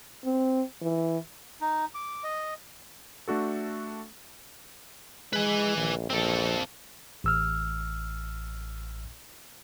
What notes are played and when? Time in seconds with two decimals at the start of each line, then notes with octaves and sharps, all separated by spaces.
0.24 C4
0.82 E3
1.61 D#4
1.94 D6
2.24 D#5
3.28 A3 D4 F#4 A4
5.33 G#3 B4 G#5
5.76 A#1
6.10 A#1 C4 A4
7.24 A1 E6 F6